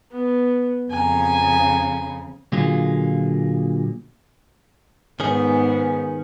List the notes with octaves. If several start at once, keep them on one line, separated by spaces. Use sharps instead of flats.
B3
F2 C#3 G#5 A#5
A#2 D3 F#3 A#3 F4 G#4
G#2 D#3 B3 C#4 G#4